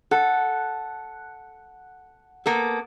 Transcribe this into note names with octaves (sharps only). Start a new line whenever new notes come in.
A4 F#5
A#3 B3 A4